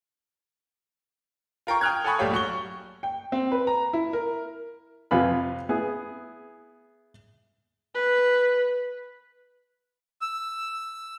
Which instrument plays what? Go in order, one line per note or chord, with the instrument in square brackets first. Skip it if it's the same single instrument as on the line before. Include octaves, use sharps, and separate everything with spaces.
[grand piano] F4 A#4 G5 C#6
G5 D#6 F6 F#6 G#6
A4 F#5 G#5 B5 C#6 D#6
A#1 G3 A3 G4 C#5 F5
F#3 F#4 C#6 G7
[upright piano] G5
C4
B4
A#5
E4
A#4
[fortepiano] F2 C3 F4 B4 G#5 B5
B3 E4 G#4
[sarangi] B4
[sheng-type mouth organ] E6